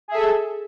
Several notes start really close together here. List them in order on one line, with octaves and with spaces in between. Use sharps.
G#4 E5 A4